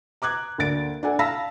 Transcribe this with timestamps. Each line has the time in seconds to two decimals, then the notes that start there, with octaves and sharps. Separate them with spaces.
0.22 A#5 D6 F#6 G#6
0.58 D2 A#3 D4 A6 D7
1.03 D4 A4 F#5 G#5
1.19 F5 A5 B5 E6 A#6 B6